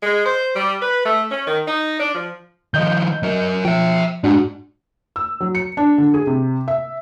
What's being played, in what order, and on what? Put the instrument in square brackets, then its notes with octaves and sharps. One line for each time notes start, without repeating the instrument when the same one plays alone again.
[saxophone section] G#3
C5
G3
B4
A3
C#4
D#3
D#4
D4
F3
[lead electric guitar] D#3 F3 [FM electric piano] D#5 G6
[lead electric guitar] F#3 A#4
[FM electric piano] F3 [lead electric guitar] E5 G5
[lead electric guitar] G#2 [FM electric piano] D4 F#4
[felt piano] E6
F#3
C#7
D4
D3
G#4
C3
E5